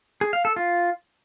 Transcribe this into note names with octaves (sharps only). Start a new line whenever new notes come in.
G#4
F5
A4
F4